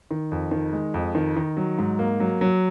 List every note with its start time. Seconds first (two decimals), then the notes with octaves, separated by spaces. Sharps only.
0.11 D#3
0.32 F2
0.51 D#3
0.73 G#3
0.94 F2
1.15 D#3
1.37 D#3
1.57 F#3
1.79 G#2
1.99 A#3
2.20 F#3
2.41 F#3